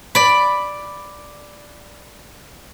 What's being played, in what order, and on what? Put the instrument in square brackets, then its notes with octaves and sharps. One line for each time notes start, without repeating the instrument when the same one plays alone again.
[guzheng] D5 B5